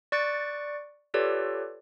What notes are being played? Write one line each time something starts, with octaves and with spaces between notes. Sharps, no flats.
D5 C#6 F#6 A6 C#7 D7
F4 G4 A4 B4 C#5 D5